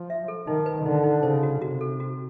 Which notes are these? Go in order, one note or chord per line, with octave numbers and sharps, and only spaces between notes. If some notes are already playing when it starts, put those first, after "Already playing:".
Already playing: F3
E5
A4
D#3 D#4
B4
D3 D#4
D#4
C#3 C5
F#4
C3 F#4
A4
F#4